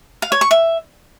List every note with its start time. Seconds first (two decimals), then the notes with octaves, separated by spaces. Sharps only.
0.22 F5
0.32 C#5
0.41 C#6
0.51 E5